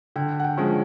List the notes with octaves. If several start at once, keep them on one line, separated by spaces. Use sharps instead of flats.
D3 G5
F#5
G5
F3 G#3 C#4